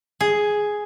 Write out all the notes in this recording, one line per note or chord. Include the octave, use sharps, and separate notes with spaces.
G#4